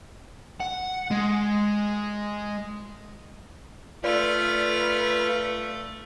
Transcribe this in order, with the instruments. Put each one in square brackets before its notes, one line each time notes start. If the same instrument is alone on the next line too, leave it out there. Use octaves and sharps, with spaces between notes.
[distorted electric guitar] F#5
G#3
[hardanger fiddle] A3 [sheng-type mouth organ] F4 F6 [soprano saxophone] B4 [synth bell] D5